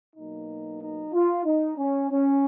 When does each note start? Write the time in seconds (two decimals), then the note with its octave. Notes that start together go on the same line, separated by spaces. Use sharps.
0.16 B2 F#3 A#3 D#4
0.82 D#4
1.14 F4
1.45 D#4
1.78 C#4
2.11 C#4